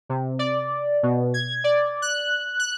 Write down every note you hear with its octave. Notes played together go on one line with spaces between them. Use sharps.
C3
D5
B2
G#6
D5
F#6
F#6